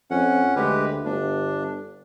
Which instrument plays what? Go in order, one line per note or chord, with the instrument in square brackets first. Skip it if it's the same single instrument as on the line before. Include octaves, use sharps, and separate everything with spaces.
[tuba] F2 [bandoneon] C#4 F#5
[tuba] D2 [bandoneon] G#3 G4 B4
[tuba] G1 [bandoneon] D4